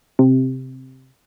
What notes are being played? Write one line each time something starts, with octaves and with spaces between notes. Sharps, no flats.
C3